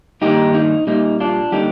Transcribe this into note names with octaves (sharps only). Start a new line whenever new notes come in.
G2 D#3 A#3 D#4 G4
D#4
A#2 G3 A#3 D#4
D4 F4
D3 G3 A#3 D#4 G4